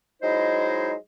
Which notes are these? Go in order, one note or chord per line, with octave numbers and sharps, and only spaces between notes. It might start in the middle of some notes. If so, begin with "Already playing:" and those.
F#3 G#3 D#4 E4 C5 D#5